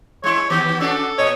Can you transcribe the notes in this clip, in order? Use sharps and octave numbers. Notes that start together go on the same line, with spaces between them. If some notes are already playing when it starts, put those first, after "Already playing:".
G#3 E4 C#5
D#3 B3 G4
C#4 D4 F#4 A4
A#2 C#5 D#5